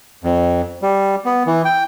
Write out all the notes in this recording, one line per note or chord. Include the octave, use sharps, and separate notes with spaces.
F2
G3
B3
E3
G5